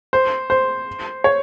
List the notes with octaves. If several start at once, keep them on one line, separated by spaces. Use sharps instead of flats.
C5
C5
C#5